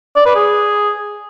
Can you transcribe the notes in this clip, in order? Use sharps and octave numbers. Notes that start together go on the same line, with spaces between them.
D5
B4
G#4